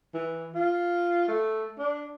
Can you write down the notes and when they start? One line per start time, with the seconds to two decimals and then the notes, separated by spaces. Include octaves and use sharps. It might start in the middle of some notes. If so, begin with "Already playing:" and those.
0.14 E3
0.55 F4
1.28 A3
1.79 D4